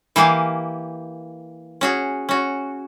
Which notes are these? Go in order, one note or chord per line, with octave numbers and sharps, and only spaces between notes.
E3 A#3 G4 F5 G#5
C#4 F#4 G#4
C#4 F#4